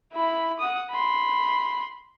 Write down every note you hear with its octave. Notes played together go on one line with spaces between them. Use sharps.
E4 B5
F#5 D#6
B5 C6